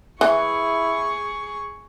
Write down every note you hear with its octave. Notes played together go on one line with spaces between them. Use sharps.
E3 E4 G#4 C#6